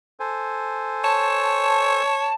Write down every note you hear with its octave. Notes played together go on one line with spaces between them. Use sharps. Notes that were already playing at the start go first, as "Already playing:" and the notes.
A4 C5 G#5
C#5 A5